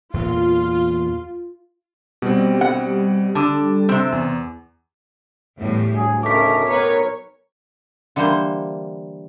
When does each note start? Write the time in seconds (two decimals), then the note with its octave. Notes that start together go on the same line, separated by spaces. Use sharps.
0.14 E2 A#2 F#3 F4
2.22 B2 G3 C4
2.61 F#5
3.35 D3 A5 D6 E6
3.89 C3 C4
4.12 E2
5.58 E2 A2 G3
5.95 D2 F#3 G#4
6.23 B1 C#3 A3 A#4 D6 B6
6.67 B1 B3 A#4 B4 C#5
8.16 D3 E3 G3 A#3 C5